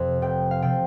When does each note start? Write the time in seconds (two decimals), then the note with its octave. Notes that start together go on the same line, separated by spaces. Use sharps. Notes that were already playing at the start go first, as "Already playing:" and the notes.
Already playing: F2 C3 F3
0.22 F1 G5
0.51 F5
0.62 C3 F3 G5